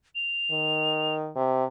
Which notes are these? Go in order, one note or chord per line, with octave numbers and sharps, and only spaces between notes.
F7
D#3
C3